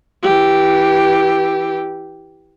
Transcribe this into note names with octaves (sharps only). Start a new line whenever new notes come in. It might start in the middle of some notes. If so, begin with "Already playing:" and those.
E3 G4